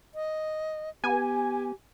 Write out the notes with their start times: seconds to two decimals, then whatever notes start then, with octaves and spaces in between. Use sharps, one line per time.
0.15 D#5
1.04 B3 G4 G#5